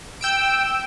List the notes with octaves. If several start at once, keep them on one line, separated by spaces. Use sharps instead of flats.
G5 E6 D7